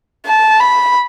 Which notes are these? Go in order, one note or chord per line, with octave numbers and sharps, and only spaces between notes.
A5
B5